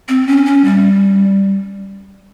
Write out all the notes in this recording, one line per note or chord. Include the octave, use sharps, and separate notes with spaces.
C4
C#4
C#4
G3